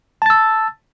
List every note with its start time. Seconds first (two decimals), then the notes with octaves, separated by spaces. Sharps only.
0.22 A5
0.26 A6
0.30 E6